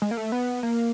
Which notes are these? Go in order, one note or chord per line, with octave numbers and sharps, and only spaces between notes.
G#3
A#3
A3
B3
A#3